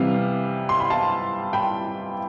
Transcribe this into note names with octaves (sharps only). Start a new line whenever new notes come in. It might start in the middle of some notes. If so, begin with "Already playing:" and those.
Already playing: C3 E3 G3 B3 F5
C6
B5
F5 A5
G5 B5